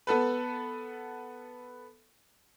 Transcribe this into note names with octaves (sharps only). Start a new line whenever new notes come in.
B3 A4 B4